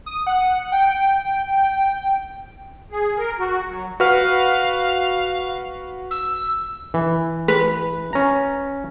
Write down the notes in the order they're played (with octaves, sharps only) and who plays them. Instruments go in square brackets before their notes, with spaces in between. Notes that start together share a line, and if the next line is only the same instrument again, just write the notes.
[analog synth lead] D#6
F#5
G5
[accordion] G#4
A#4
F#4
F#3
[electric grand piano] F#4 B4 F6 [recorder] F5
[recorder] E6
[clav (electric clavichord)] E3
[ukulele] B4
[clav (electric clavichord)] C#4 A#5